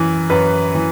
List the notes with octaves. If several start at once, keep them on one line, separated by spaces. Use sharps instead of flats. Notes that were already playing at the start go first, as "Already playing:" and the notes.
Already playing: F#2 E3
F#2 B4
E3